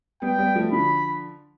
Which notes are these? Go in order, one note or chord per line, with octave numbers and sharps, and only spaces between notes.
G3 B3 G5
G3 B3
F3 A3
D3 F3 B5